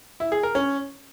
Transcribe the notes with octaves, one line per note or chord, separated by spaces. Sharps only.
E4
G#4
A#4
C#4